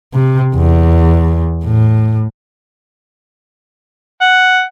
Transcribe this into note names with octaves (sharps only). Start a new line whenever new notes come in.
C3
E2
A2
F#5